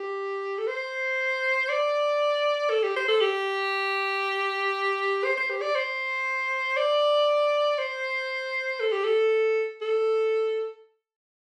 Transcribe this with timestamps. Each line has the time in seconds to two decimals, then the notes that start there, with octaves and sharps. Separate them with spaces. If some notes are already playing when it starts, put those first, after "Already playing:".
Already playing: G4
0.58 A4
0.67 C5
1.69 D5
2.70 A4
2.83 G4
2.96 C5
3.08 A4
3.21 G4
5.24 C5
5.37 C5
5.50 G4
5.62 D5
5.75 C5
6.77 D5
7.79 C5
8.80 A4
8.92 G4
9.04 A4
9.81 A4